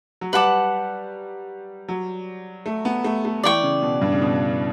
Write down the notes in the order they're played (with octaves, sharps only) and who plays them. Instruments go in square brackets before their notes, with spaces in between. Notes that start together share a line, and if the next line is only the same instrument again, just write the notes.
[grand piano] F#3
[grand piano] G3 [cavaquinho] B4 F#5 A5 D6
[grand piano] F#3
A3
B3
A3
A3
[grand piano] E3 [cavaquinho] D5 G5 C#6
[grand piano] C#3
B2
G2
C#3
B2